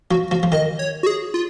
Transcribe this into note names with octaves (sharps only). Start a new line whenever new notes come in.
F3 F#4
F3 F#4
F3
D#3 D#5
C#5
F#4
G#4
F4